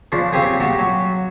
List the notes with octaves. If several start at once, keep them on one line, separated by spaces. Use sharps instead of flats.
C#3 F3 D4
C#3 C4 G4 G#4
F#4 G4 A5
F#3